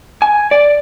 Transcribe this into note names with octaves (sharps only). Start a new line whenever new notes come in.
G#5
D5